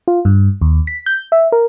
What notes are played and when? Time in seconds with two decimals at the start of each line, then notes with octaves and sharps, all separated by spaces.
0.08 F4
0.25 G2
0.61 D#2
0.87 B6
1.06 G6
1.32 E5
1.52 A#4